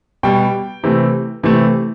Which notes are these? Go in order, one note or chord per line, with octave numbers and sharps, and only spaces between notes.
B2 G3 G5
C3 E3 A3
C3 E3 A3